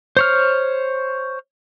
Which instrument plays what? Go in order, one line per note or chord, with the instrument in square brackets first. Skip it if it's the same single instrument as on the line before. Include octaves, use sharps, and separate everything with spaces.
[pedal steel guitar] C5 C#5 F6